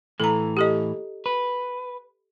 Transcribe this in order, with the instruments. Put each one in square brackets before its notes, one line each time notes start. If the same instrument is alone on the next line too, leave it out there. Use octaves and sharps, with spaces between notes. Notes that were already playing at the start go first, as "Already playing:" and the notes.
[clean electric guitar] A2 E3 [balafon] A4 A#5
[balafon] G4 A4 D#5
[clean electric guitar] B4